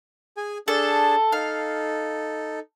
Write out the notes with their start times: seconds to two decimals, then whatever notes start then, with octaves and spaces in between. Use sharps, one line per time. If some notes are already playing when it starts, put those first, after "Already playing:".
0.37 G#4 G#5
0.68 D4 G#4 A4 A5
1.32 D#4 A4 F5